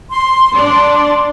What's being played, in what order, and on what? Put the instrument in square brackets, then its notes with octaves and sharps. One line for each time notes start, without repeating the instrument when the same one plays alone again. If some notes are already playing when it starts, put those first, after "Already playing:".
[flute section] C6
[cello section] D4 D5 [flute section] C6